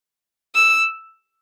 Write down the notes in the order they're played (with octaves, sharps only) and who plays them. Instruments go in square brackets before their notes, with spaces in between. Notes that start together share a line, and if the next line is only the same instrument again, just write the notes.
[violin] E6